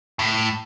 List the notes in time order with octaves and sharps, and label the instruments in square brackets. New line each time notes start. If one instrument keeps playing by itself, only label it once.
[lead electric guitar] A2